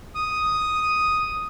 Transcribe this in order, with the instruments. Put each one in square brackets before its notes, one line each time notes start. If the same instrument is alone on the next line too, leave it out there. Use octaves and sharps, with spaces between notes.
[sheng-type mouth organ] D#6